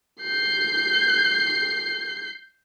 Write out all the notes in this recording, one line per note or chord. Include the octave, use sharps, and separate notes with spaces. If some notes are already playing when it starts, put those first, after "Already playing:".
G6 C7